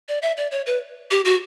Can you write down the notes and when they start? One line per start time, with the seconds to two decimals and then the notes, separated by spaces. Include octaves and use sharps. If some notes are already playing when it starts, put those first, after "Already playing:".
0.08 D5
0.22 E5
0.37 D5
0.51 C#5
0.66 B4
1.11 G4
1.25 F#4